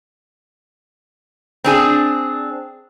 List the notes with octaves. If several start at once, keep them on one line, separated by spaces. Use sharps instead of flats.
C4 D4 G#4